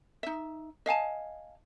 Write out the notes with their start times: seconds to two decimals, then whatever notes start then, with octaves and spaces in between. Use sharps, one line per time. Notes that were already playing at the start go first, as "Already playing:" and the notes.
0.23 D#4 E5
0.86 D#5 F5 G#5 A5